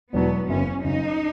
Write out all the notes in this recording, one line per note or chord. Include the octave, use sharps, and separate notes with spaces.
E1 E2 B2 F#3 B3
F#1 F#2 C#3 C#4
F#1 F#2 C#3 D#4